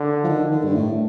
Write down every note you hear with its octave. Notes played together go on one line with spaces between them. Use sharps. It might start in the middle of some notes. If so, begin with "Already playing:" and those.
Already playing: D3
F3
D#3
D#3
G2
A2